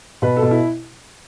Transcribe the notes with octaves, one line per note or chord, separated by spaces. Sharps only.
B2 B4
A4
B2
E4